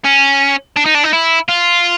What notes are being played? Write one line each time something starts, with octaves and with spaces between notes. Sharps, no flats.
C#4
D4
D#4
D4
D#4
E4
F4